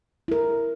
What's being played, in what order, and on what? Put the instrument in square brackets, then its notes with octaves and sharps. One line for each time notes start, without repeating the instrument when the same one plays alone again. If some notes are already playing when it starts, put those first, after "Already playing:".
[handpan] E4 A#4